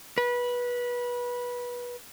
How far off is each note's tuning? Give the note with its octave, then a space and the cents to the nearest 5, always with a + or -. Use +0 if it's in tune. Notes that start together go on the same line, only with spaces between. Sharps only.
B4 -20